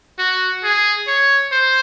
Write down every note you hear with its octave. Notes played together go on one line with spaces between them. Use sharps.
F#4
G#4
C#5
C5